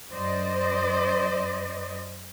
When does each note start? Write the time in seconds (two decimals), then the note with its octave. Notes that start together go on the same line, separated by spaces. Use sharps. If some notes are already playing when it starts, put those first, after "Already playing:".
0.12 F#2 C5 D5 D#5